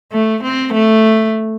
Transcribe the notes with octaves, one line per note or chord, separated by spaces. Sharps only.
A3
C4
A3